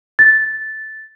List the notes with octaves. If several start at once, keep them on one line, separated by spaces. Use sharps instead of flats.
A6